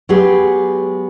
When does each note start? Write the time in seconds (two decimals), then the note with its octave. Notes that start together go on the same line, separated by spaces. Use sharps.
0.09 F#3 G#3 B3 G4 G#4